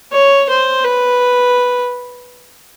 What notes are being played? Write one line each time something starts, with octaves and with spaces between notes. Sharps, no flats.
C#5
C5
B4